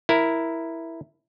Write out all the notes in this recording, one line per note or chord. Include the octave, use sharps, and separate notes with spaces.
E4 A#4